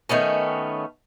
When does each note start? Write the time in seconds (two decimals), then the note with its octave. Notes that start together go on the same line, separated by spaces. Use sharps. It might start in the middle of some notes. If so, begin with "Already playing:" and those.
0.09 D#3 A3 B3 C#4